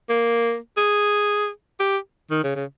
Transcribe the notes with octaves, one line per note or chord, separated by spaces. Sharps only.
A#3
G#4
G4
D#3
C#3
C#3